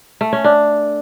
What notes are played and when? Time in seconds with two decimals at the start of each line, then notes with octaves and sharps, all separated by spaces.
0.21 A3
0.33 C#4
0.44 D4